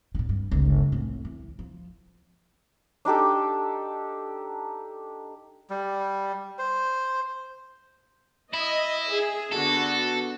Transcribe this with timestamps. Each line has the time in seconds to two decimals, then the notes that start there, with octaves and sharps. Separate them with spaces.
0.15 A#2 D#3
0.29 G2
0.51 G1 C#2
0.92 C2 A2
1.25 E3
1.59 F3
3.05 D4 D#4 G4 A4
5.70 G3
6.58 C5
8.54 E4 D#5
9.12 G#4
9.53 D3 B3 F#4 A4